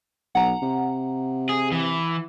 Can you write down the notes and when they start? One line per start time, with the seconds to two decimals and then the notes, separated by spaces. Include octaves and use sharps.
0.35 B1 F#5 A#5
0.62 C3
1.49 G#4
1.72 E3